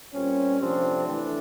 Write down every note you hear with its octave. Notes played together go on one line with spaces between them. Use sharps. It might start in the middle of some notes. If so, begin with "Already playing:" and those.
A#2 G3 C4 C#4
C3 F3 A3 C4 D4
E3 A3 C4 D4